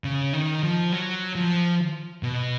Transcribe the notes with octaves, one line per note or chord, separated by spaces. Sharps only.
C#3
D#3
F3
F#3
F3
B2